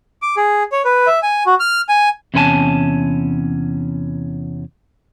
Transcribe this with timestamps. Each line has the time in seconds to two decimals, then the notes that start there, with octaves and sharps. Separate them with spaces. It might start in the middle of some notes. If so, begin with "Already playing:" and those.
0.22 D6
0.37 G#4
0.72 C#5
0.85 B4
1.07 E5
1.23 G#5
1.46 F#4
1.60 F6
1.89 G#5
2.34 E2 C3 C#4 B4 G#5 A5